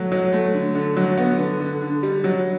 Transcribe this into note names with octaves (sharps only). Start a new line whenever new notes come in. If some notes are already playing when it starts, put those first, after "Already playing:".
Already playing: F#3 A3
F#3
A3
D3
D3
F#3
B3
D3
D3
D3
G3
F#3